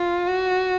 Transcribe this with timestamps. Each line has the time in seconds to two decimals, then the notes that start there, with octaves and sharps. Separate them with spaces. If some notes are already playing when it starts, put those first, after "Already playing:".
Already playing: F4
0.27 F#4